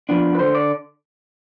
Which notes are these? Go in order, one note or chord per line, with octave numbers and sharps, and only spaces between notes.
F3 B3 D4
B4
D3 C5
D5